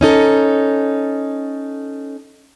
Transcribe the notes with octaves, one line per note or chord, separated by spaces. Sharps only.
C#4 D#4 A4